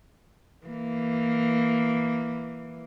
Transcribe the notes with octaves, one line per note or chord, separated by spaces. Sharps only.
E3 A#3